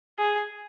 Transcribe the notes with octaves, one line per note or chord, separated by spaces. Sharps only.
G#4